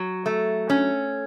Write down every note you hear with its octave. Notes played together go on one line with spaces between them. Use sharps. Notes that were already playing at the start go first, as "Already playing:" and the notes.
Already playing: F#3
A3
C#4